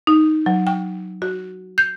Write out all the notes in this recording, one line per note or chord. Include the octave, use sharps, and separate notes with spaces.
D#4
F#3
G5
F#4
G6